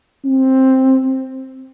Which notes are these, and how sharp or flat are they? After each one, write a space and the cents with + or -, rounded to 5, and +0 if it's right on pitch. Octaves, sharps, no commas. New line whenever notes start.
C4 +10